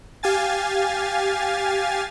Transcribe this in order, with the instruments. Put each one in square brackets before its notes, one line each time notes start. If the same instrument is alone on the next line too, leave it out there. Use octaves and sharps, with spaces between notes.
[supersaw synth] G4 F5 G#5 A6